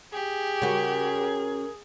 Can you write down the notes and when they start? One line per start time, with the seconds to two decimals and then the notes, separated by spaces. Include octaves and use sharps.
0.13 G4 G#4
0.62 C#3 F#4 A#4